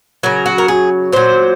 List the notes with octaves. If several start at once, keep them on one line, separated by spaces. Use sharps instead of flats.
C#3 F#3 A#4
F#4
A#4
G#4
A#2 F#3 C5